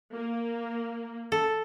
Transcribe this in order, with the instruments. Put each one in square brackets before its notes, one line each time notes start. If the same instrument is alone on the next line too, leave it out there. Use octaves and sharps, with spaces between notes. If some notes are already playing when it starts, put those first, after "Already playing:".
[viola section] A#3
[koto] A4